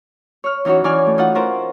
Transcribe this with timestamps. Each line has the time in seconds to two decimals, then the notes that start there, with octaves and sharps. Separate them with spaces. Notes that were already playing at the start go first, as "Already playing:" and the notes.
0.44 C#5 F6
0.65 E3 C#4 D#4 F#4 C#5
0.84 E3 C#4 D5 G#5 F6
1.07 A3
1.18 D#4 F4 F#5
1.35 C#4 F4 A#4 C5